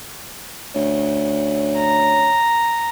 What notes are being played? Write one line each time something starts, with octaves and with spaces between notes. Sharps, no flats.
D2 C#4
A#5